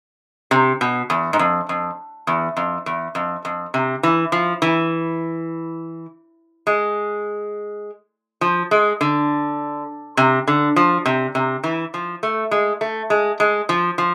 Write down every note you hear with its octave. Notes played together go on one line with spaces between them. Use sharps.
C3
B2
E2
G#2
F2
F2
E2
F2
E2
F2
F2
C3
E3
F3
E3
G#3
F3
G#3
D3
C3
D3
F3
C3
C3
E3
F3
A3
G#3
A3
G#3
G#3
F3
F3